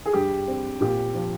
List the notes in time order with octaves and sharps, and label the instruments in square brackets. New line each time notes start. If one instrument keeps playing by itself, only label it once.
[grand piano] G#4
[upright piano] G2 [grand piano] G4
[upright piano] C4
[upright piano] A#2 [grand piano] G4
[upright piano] F3